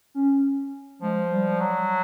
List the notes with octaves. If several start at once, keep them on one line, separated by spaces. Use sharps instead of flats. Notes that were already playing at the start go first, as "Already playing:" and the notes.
C#4
F3 G#3
G3
F#3